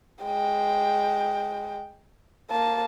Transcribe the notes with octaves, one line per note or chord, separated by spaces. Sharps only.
G#3 G5
A#3 A5